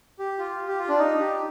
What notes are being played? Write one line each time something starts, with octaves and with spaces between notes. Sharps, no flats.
G4
F4
G4
F4
D4
D#4
G4